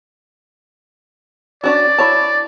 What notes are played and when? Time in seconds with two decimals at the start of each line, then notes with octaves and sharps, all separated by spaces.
1.64 C#4 D4 F#4 D5
1.98 E4 C#5 A5